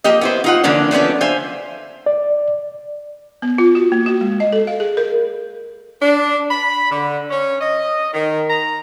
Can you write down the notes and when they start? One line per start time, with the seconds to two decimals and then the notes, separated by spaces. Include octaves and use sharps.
0.04 F3 A#3 G4 D#5
0.21 B3 E4 C5
0.44 D#4 F4 F#5
0.64 D3 E3 F3 A#3 C#4 D4
0.91 F3 A3 B3 C#4 D4
1.21 C5 E5 F5 G#5
2.06 D5
3.42 B3
3.58 F4
3.75 F#4
3.92 A#3
4.06 F#4
4.21 G#3
4.40 D#5
4.53 A4
4.67 F5
4.80 G#4
4.97 A#4
6.01 D4
6.50 B5
6.91 D3
7.31 C#4
7.61 D#5
8.13 D#3
8.50 A#5